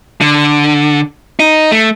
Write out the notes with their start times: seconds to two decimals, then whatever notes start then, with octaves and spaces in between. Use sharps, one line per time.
0.21 D3
1.40 D#4
1.71 A3